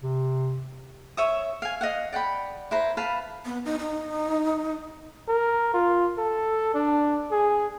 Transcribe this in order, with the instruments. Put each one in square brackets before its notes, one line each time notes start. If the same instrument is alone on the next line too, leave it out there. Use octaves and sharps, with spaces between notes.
[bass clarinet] C3
[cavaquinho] C#5 E5 D#6
F5 G#5
D#5 F5 F#5
D5 F#5 G5 B5
E4 B4 C5 A#5
B4 F5 A5 B5
[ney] B3
D#4
D#4
[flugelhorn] A#4
F4
A4
D4
G#4